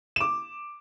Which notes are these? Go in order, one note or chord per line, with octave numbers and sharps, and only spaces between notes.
D6 E7